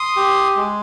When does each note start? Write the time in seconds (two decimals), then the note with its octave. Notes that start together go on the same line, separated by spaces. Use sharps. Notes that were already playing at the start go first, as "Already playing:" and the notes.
Already playing: C6 D#6
0.17 G4
0.56 G#3